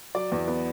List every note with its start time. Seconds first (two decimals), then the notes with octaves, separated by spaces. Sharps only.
0.15 F#3 D5
0.32 E2
0.48 B3